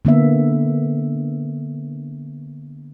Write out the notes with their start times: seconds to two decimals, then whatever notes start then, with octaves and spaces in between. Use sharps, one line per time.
0.05 D3 A#3 B3 E5